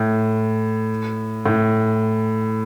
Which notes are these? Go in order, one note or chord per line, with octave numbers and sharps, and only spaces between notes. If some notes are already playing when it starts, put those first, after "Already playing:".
Already playing: A2
A2